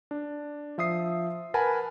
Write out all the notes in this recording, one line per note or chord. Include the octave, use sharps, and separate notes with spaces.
D4
F3 E5 D#6 C7
A#4 B4 F#5 G#5 A5 B5